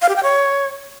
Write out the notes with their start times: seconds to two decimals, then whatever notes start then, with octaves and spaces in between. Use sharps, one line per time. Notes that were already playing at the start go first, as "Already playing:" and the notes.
0.02 F5
0.09 G4
0.16 G5
0.23 C#5